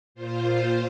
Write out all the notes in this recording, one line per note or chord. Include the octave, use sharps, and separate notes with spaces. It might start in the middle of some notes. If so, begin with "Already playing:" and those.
A#2 F4 C5